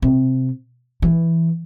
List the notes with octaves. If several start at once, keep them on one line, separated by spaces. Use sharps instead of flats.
C3
E3